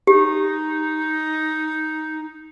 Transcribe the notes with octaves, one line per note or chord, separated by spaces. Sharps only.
D#4 G4